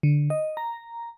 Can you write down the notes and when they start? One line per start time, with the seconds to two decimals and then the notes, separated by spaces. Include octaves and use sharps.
0.03 D3
0.30 D#5
0.57 A#5